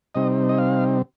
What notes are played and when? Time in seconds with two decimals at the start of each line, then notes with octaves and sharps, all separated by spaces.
0.15 C3 G3 C4 D#4 D#5
0.49 D#5
0.58 F5